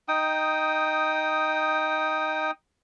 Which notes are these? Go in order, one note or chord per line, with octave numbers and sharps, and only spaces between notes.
D#4 G5 D#6